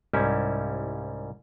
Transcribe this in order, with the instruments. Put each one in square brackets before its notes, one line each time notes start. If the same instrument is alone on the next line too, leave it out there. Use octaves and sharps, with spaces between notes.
[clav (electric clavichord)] C2 G#2 G3 C#4 E4